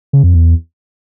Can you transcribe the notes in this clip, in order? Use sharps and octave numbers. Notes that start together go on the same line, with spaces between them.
C#3
F2
E2